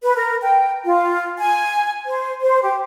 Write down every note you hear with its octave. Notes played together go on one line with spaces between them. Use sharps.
B4
A#4
G5
F4
G#5
C5
C5
G4